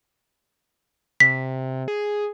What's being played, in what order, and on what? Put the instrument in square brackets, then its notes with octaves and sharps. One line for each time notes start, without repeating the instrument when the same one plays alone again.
[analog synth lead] C3 [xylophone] B6
[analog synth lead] G#4